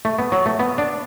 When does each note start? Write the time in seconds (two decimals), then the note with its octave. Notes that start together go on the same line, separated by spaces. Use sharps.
0.05 A3
0.18 B3
0.32 F#3
0.46 A3
0.59 B3
0.78 D4